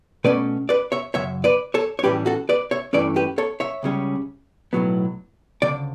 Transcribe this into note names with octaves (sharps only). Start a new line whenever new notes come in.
B2 A3 C#4 B4 D5
B4 D5
C#5 E5
F#2 C#3 C#5 E5
B4 D5
A4 C#5
C#5
A2 E3 G3 C#4 G4 B4
F#4 A4
B4 D5
C#5 E5
G2 E3 A3 C#4 B4 D5
G4 B4
A4 C#5
C#5 E5
C#2 C#3 G3 C#4
B1 A2 F#3 B3
D2 C#3 D5